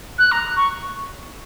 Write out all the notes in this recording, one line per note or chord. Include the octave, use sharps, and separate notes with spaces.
F#6
A#5
C#6